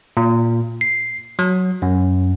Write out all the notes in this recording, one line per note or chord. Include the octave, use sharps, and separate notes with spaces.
A#2
C7
F#3
F#2